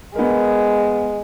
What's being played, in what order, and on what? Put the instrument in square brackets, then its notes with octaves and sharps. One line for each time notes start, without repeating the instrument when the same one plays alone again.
[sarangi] G#3 [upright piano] B3 A#4